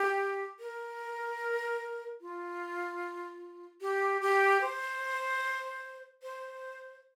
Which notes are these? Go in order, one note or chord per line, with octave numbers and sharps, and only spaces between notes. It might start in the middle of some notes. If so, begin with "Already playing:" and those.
Already playing: G4
A#4
F4
G4
G4
C5
C5